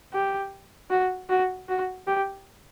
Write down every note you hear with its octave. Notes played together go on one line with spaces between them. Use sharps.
G4
F#4
F#4
F#4
G4